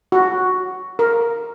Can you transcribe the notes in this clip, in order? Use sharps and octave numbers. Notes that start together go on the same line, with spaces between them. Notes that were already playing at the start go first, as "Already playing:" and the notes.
F#4
A#4